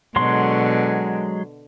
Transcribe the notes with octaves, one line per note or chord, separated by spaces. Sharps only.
B2 D3 F#3 G#3 C6